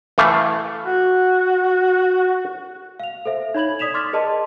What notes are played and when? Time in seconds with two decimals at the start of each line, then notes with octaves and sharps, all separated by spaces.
0.18 E3 A3 F5
0.86 F#4
3.00 F5 F7
3.26 A4 C5 E5
3.54 D#4 C#5 B5 G#6 F#7
3.79 D5 D#6 B6 E7 F7
3.94 C6 D6 F6 A6 B6
4.13 G#4 A#4 D5 D#5 A5 C6